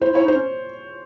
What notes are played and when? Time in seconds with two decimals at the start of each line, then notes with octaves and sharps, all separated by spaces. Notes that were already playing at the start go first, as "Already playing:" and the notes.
0.01 E4 C5
0.13 E4 C#5
0.24 D#4
0.28 C5
0.35 C#4